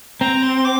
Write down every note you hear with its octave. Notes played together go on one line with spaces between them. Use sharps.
C4 A#5
C6
D6